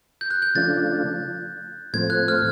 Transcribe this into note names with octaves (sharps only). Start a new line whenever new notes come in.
G6
F#6
G6
C#3 F3 A3 D4 F4 A6
A2 F3 A3 C4 G#6
F#6
F6